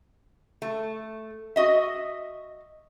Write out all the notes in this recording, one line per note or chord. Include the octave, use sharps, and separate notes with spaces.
A3
F#4 D#5 E5